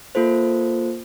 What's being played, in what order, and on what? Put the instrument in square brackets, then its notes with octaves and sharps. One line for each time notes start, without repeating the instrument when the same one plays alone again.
[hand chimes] A#3 F4 A4 C5